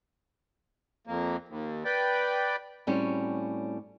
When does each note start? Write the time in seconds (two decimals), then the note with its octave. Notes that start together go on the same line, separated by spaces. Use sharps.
1.07 F2 A#3
1.48 D#2
1.85 B4 D5 G5
2.87 A2 G3 C4 C#4 F#4 G4